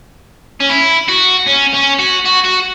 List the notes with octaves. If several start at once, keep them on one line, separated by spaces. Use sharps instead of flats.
C#4
E4
F#4
C#4
C#4
F#4
F#4
F#4